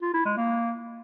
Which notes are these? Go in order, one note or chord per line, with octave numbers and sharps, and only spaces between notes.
F4
E4
G#3
A#3